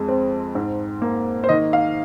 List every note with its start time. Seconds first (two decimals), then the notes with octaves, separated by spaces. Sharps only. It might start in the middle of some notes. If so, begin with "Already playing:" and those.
Already playing: F2 G#3
0.08 C4
0.55 G#2
1.02 A#3
1.44 C5
1.49 D#3 D#5
1.73 F5